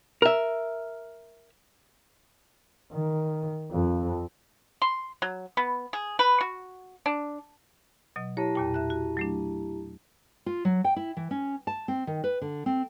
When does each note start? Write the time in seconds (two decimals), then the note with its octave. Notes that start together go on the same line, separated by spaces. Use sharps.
0.22 A#4 E5
2.93 D#3
3.71 F2
4.82 C6
5.22 F#3
5.57 B3
5.93 G#4
6.19 B4
6.41 F#4
7.06 D4
8.16 B2 F#3 D#5
8.37 E4 G4 C#5 A5
8.55 E2 A#2 G5
8.74 E5 F#6
8.90 F#4
9.17 F#3 A3 D4
10.46 F4
10.65 F#3
10.84 G5
10.96 E4
11.17 E3
11.31 C#4
11.67 A5
11.88 C4
12.07 D#3
12.24 B4
12.42 D3
12.66 C4